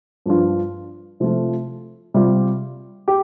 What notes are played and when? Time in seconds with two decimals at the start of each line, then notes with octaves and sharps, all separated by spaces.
0.26 G2 F3 D4 F4
1.20 C3 F3 A3 F4
2.14 C3 G3 F4
3.08 G4